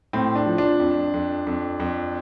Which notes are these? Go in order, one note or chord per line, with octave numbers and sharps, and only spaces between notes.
A2 C4
D4
F3
D4
F2
F2
F2
F2